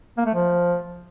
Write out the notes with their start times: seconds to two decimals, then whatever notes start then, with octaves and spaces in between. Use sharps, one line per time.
0.18 A#3
0.26 A3
0.35 F3